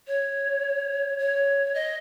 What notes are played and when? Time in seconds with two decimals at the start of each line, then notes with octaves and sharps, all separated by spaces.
0.07 C#5
1.19 C#5
1.74 D#5